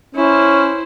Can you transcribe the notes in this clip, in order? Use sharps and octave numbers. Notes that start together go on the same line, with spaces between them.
C#4 E4 C5